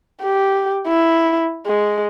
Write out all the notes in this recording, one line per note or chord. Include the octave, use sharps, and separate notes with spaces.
G4
E4
G#3